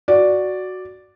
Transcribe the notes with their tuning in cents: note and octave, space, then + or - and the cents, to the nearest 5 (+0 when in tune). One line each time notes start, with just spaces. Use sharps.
F#4 +0 D5 +0